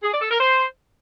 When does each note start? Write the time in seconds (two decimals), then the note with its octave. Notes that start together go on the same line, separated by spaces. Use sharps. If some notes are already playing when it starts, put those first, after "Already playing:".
0.03 G#4
0.12 D5
0.21 A4
0.30 A#4
0.39 C5